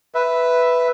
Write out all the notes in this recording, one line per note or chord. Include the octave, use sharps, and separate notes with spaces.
B4 E5